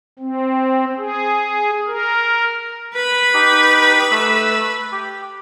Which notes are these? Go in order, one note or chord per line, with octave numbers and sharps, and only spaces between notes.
C4
G#4
A#4
B4 B5
D#4 G4
A3 E6
G4